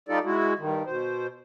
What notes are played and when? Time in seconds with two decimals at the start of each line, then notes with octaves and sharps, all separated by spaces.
0.09 G3 D#4 F4 G4 A4 D5
0.24 G#3 E4 F#4
0.58 G2 D#3
0.86 B2 C5